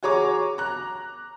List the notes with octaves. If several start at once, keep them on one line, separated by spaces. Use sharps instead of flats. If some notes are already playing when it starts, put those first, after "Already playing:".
F#4 G#4 C#5 A#5 D6
A#5 F#6